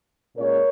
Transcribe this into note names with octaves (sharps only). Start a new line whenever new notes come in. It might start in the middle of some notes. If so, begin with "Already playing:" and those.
A#2 G#3 C#4 A#4 C#5